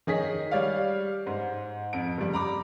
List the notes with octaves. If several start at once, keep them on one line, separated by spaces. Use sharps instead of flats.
D#3 D#4 G#4 C#5 D#5 B6
G3 C#5 D5 F5
G#2 C5
F2 D7
F#1 G3
A#5 B5 D6